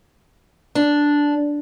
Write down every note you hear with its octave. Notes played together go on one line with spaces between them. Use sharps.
D4